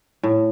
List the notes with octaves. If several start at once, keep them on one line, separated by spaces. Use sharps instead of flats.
A2